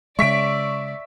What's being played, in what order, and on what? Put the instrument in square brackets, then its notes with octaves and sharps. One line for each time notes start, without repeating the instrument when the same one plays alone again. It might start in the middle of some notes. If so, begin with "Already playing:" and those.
[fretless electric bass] C#3 G#3 [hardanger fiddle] D5 [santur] E5 [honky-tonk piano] C#6 B6 D7